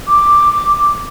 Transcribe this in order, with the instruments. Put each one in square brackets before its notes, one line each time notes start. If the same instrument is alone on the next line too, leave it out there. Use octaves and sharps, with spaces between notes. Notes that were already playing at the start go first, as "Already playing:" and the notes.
[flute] D6